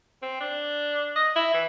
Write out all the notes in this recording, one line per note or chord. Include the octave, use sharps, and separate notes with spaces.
C4
D4
D#5
E4
E3